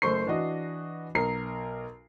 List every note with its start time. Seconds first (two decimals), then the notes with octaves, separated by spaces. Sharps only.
0.02 F#1 A3 C5 C#6 C7
0.27 E3 D4 F#4 D#5
1.15 B1 A#4 C7